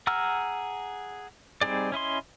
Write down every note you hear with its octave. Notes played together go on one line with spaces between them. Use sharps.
G#4 F#5 A#5 E6 F6
G3 C4 D#4 G#4 D5
C#4 E4 D#5 C6